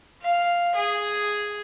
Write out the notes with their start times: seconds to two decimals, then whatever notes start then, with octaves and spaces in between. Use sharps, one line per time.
0.22 F5
0.75 G#4